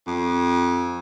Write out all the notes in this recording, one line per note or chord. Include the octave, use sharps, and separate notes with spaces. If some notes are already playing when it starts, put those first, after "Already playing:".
F2